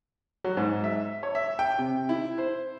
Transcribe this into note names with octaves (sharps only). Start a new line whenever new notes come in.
F#3
G#2
E5
C#5
E5
G5
C3
E4
C5